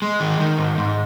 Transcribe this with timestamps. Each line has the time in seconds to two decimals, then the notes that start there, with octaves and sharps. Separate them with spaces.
0.02 G#3
0.20 D#3
0.40 D#3
0.58 G#2
0.78 G#2